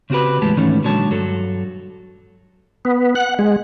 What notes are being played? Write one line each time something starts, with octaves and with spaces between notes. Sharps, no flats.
C#3 C4 F#4 G4 B4
E2 A2 C#3 G#3 G4 A5
G#2 D#3 E3 A3 C#4
A#2 D3 F#3 G#3 C#5 A5
G2 F#3 A4
B3
F#5
G#3